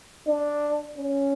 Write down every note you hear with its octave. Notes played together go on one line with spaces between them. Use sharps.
D4
C#4